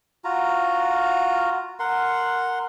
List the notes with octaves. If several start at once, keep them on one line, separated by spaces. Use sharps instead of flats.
F4 F#4 A#5
A#4 F#5 C6